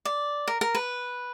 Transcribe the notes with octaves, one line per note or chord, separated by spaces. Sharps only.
D5
A#4
A#4
B4